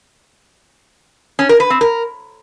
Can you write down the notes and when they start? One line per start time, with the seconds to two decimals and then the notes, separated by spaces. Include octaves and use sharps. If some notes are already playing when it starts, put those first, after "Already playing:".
1.39 C#4
1.49 A#4
1.60 B4
1.70 C4
1.81 A#4